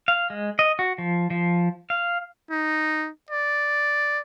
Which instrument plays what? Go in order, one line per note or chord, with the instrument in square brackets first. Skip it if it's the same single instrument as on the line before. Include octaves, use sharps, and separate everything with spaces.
[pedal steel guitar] F5
G#3
D#5
F#4
F3
F3
F5
[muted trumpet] D#4
D5